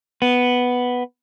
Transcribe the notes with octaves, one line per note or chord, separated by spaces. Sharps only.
B3